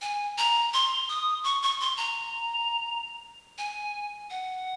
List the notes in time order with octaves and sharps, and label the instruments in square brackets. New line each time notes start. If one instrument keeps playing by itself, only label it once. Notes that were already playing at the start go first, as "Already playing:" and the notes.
[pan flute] G#5
A#5
C6
D#6
C#6
C#6
C6
A#5
G#5
F#5